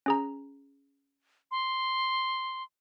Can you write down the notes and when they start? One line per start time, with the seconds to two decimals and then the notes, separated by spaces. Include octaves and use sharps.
0.06 C#4 G#4 A#5
1.51 C6